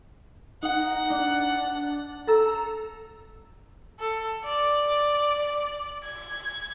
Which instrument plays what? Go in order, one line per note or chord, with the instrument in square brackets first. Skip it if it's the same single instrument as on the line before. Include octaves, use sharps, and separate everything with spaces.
[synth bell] D#4 [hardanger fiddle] F#5
[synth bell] D4
A4 A#5 E6
[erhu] A4
D5
G#6